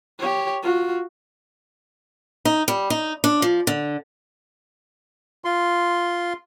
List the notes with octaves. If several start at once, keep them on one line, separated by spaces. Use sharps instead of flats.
G4 C#5
F4 F#4
D#4
G3
D#4
D4
F3
D3
F4 C6